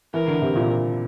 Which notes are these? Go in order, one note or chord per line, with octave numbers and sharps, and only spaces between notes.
E3 A#4
D3
C3
A#2